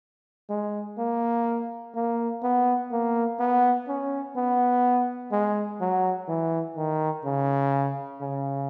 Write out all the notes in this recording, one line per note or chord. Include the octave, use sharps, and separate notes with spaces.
G#3
A#3
A#3
B3
A#3
B3
C#4
B3
G#3
F#3
E3
D#3
C#3
C#3